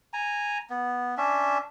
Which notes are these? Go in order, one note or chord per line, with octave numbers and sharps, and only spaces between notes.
G#5 A#5
B3
C#4 D4 E5